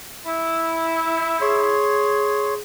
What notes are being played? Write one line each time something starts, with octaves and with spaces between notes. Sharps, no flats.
E4
G#4 C#5 C6